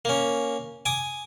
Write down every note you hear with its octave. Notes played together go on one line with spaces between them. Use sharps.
A#3 C#4
G#5 D6 D#6